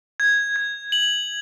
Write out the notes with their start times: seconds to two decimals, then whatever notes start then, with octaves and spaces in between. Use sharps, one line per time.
0.20 G#6
0.56 G#6
0.92 F#7